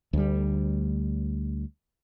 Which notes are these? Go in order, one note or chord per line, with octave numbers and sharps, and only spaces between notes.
D2 G3